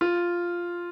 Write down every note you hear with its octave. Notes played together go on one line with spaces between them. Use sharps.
F4